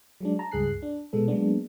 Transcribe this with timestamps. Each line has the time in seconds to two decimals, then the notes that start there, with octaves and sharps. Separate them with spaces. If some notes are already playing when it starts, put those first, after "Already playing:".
0.21 F#3 G#3 D4
0.39 A5 A#5
0.52 C#2 G2 G#4 F#6 C7
0.82 D4
1.13 B2 G#3 B3 A4
1.28 F#3 G#3 A#3 B3 D4